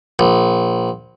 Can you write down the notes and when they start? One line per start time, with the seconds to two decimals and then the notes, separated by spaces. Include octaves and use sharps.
0.19 A#1